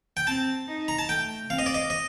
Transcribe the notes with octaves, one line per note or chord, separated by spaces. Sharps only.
G5
C4 A5
D#4
A#5
A5
A3 G5
C4 F5
D#5
D5
D#5
D#5